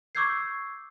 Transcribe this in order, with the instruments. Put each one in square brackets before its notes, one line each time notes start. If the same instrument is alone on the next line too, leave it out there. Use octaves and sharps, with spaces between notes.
[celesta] C#6 D6 E6 G6 G#6 C7